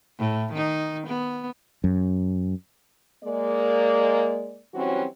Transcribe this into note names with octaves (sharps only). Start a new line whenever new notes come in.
A2
D#3 D#4
B3
F#2
G#3 A#3 D5
E3 F#3 G3 C4 C#4 F#4